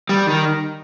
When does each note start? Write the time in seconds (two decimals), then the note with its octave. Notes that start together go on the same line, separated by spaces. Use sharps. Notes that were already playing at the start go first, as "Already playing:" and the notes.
0.09 G3
0.27 D#3